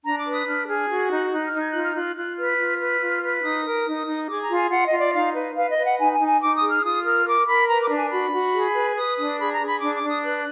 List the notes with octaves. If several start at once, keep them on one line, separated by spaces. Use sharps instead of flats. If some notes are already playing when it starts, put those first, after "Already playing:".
D4 A#5
D6
B4
D#6
D4 F6
G#4 F6
F#4 G#6
D#4 F#6
D#4 F#6
F6
D#4
G#6
F4 F#6
F6
F4 F#6
F4 F#6
B4 F6
F4
B4
F4
B4
D#4 D#6
A#4
D#4
D#4
G#4 D6
A#5
F4
G#5
F4 F#5
D#5
F4
D5
D#4 F5
B4
B4 F5
D#5
B4
F#5
D#4 G#5
G#5
D#4
G#5
D#4 D6
D#6
G#4
F6
F4 D#6
A#4 F6
A#4 D6
A#4 B5
B4 A#5
D6
D4
G#5
F#4 B5
F#4
G#4
B4
B4 D#6
D4 D#6
G#4 B5
A#5
G#4
B5
D4 D6
D6
D4
D#6
B4 F#6